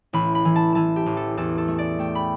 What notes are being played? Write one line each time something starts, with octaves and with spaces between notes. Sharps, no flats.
A1 B5
B5
E3
A5
E3 A5
G4
A1
A4
E2 A4
A4
A3
D5
A3 G5
B5